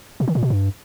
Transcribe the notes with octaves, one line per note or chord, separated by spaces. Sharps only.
B2
D#3
A#2
B2
G2